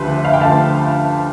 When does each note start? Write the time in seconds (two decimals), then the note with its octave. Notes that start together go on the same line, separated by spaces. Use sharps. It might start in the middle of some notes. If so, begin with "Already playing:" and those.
Already playing: D2 D3 F3 G4 B4 C5
0.17 E5
0.25 F5
0.33 G5
0.41 D2 D3 F3 F5 A5